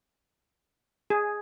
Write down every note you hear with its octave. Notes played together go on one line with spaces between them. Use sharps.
G#4